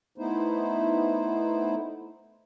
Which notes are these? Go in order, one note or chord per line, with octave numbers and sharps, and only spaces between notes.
A3 B3 D#4 E4 C5